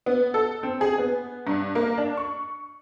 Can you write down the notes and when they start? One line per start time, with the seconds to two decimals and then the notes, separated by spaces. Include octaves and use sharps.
0.06 B3
0.34 A4
0.63 C4
0.81 G#4
0.98 B3
1.47 G2
1.75 A#3
1.98 D4
2.17 C#6